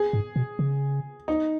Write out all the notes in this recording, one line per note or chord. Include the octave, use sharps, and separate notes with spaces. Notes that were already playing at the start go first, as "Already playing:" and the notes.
Already playing: G#4
G#2
B2
C#3
D#4